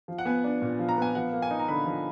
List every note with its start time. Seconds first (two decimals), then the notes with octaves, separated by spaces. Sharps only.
0.08 F3
0.18 F#5
0.25 B3 G#5
0.44 D4
0.62 A#2
0.79 F3
0.89 A#5
0.98 B3 G#5
1.15 F3 F#5
1.33 A#3
1.42 G#5
1.51 D#4
1.59 A#5
1.68 D3 B5
1.86 F3